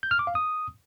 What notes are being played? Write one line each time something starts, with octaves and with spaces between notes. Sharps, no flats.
G6
F6
D6
F5
D#6